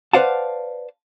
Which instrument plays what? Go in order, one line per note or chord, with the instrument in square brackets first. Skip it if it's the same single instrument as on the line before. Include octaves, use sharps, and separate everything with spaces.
[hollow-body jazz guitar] B4 C5 D5 F5 F#5 A5